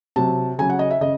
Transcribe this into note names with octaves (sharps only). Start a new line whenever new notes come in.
C3 F#3 A5
C#3 F#3 G#5
F#5
D#5
E5
C#3 D#5